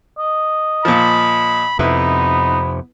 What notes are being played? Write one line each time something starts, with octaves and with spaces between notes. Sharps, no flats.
D#5
A#2 F3 B5
F2 C3 B3 D#4 E4 B4